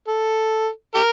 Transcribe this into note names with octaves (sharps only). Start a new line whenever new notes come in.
A4
G4 A#4